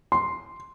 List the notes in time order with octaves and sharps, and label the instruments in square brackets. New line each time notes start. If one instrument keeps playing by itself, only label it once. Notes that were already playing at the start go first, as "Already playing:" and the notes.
[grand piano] C6